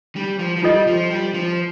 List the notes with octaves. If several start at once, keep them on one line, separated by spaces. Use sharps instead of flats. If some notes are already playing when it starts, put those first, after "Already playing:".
G3
F3
F3
G3 F4 A4 D#5
F3
G3
F3